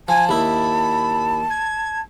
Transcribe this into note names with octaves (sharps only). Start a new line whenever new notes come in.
F3 G#5 A5
D#2 E4 B5
G#6